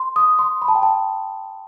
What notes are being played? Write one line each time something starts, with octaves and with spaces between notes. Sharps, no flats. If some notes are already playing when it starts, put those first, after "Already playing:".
Already playing: C6
D#6
C6
B5
A5
G5
A5